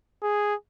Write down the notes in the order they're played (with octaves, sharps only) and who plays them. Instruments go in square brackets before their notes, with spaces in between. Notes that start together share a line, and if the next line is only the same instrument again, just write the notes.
[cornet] G#4